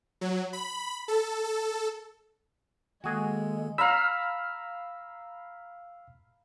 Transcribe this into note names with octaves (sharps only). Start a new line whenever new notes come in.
F#3
B5
A4
A4
D#3 G#3 A#3 F#4 G#4 A4
F5 A#5 B5 E6 F6